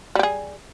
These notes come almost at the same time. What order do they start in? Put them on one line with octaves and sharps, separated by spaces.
G3 G4 G#4